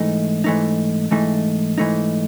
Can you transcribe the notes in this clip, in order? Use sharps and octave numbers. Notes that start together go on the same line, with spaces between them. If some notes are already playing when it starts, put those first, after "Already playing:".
Already playing: G#2 E3 A3 D#4
G#2 E3 A3 D#4
G#2 E3 A3 D#4
G#2 E3 A3 D#4